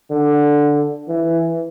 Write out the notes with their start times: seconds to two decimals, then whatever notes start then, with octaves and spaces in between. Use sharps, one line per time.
0.11 D3
1.08 E3